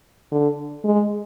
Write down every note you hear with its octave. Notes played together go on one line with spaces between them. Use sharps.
D3
G#3